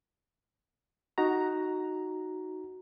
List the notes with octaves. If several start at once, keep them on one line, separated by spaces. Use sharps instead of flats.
D#4 F#4 A#5